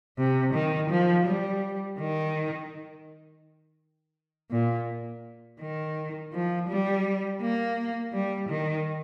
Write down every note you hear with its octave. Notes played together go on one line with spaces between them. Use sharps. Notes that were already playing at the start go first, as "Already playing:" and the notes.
C3
D#3
F3
G3
D#3
A#2
D#3
F3
G3
A#3
G3
D#3